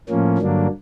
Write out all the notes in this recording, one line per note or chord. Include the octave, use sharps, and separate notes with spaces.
A2 F3 A#3 C#4
G2 D3 F#3 A#3 D4